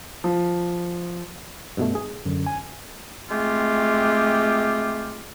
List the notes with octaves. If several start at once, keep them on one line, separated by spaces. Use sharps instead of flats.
F3
G2 B2 A3
G#4
F#2 D3
G#5
G#3 A3 C4 F4 G4